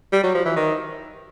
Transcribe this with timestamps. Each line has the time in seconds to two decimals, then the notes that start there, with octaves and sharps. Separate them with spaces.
0.12 G3
0.23 F#3
0.34 F3
0.46 E3
0.56 D#3